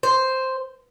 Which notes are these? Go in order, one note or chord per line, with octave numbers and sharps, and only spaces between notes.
C5